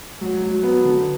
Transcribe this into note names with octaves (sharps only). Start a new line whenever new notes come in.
F#3
F#3
B3
D3